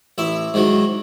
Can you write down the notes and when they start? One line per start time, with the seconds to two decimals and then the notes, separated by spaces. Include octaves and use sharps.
0.18 A1 E4 E5
0.54 G#2 D#3 F#3